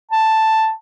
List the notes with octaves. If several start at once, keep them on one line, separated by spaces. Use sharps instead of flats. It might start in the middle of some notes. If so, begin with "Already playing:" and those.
A5